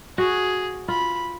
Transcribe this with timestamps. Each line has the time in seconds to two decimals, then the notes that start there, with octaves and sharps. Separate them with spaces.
0.18 F#4 G#4
0.88 F4 B5